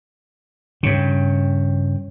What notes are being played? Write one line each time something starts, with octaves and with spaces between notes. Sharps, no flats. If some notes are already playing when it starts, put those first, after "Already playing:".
G2 C#3